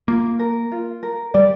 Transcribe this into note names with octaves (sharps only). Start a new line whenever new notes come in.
A#3 F4
A#4
F4
A#4
G3 D5